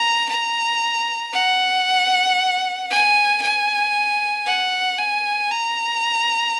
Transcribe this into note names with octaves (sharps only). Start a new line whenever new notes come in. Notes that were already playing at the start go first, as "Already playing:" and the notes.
Already playing: A#5
A#5
F#5
G#5
G#5
F#5
G#5
A#5